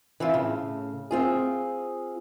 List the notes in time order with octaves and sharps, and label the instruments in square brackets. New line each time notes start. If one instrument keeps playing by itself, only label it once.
[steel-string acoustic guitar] E3 C4 E4 F4
A2 C#3
C4 F4 G#4